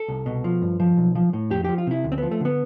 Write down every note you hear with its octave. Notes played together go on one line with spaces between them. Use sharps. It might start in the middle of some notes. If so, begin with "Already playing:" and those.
Already playing: A4
C2
B2
F3
G2
F3
B1
F3
A2
F2 G4
F3 G4
F4
C3 E4
D2
C4
F3 B3
A3
D3 B3